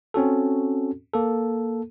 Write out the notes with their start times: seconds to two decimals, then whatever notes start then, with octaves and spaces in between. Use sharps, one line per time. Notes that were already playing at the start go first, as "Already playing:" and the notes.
0.14 C4 C#4 F#4 A4
1.14 A#3 A4